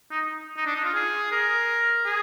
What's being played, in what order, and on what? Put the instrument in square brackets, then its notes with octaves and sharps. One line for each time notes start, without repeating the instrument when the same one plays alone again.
[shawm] D#4
D#4
D4
D#4
F4
G#4
A#4
G#4